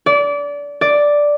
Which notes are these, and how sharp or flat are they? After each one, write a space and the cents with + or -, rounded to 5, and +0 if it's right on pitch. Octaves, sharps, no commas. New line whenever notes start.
D5 -25
D5 +0